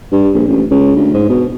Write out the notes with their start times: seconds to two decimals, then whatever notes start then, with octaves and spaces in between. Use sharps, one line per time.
0.12 G2
0.34 A#1
0.48 A1
0.71 C#2
0.96 D2
1.13 G#2
1.29 B2